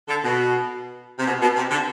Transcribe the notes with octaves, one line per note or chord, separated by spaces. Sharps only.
D3
B2
C3
B2
B2
C3
D3